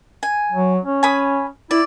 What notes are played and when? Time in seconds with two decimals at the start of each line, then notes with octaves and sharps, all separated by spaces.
0.23 G#5
0.52 F#3
0.85 C#4
1.03 G#5 B5 D#6
1.71 E4 D5